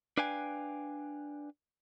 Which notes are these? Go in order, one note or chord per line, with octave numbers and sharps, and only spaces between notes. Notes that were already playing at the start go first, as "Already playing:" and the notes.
D4 B4 F5 G5 G#5